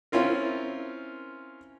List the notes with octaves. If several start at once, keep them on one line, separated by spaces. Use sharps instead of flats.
C4 C#4 E4 F4 A#4